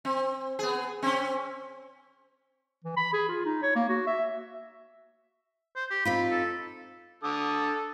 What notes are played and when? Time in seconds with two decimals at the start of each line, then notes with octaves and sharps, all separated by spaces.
0.05 C4
0.59 B3 G#4
1.03 C4 C#4
2.84 E3
2.97 B5
3.13 G#4
3.28 F4
3.45 D#4
3.63 C#5
3.76 A#3
3.89 F#4
4.07 E5
5.76 C5
5.90 G4
6.05 C4 D#4 F4 B5
6.31 A4
7.24 D3 A4 D#6